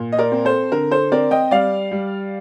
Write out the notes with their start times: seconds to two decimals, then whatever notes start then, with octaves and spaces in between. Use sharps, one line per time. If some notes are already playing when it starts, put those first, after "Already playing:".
Already playing: A#2
0.12 D#5
0.19 A#4 D5
0.32 C4
0.45 A4 C5
0.72 D3 A#4
0.91 A4 C5
1.12 C4 A#4 D5
1.31 D#5 G5
1.51 G3 D5 F5
1.92 G3